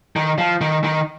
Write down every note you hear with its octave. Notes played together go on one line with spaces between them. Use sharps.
D#3
F3
D#3
D#3